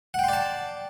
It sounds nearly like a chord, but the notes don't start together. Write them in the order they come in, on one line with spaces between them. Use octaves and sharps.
F#5 G5 C6 D5 A5